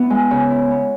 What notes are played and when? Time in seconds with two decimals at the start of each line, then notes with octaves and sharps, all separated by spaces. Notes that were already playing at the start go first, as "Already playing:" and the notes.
Already playing: B3 E4
0.10 G#3
0.31 C#3
0.50 E4
0.70 B3